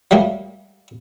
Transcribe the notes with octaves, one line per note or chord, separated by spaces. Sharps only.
F#3 G3 A3 A#3